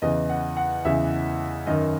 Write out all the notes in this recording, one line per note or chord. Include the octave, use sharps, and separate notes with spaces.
E2 C#3 E3 D#5
F#5
F#5
E2 C#3 E3 E5
F#2 D#3 D#5